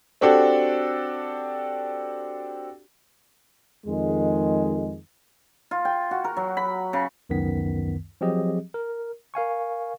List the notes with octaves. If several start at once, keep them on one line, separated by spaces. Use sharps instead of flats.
C4 D4 F#4 G4 A4
F2 D#3 G#3
F4
G5
F#4
A#4
F#3
B5
C#3
C#2 F#2 D#3 B3 B6
F3 F#3 C4 G4 G#4 D#5
A#4
A#4 F5 G#5 C#6